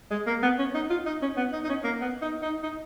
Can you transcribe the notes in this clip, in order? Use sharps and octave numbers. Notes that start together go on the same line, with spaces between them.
G#3
A#3
B3
C#4
D#4
F4
D#4
C#4
B3
D#4
D#4
C#4
A#3
B3
D#4
D#4
D#4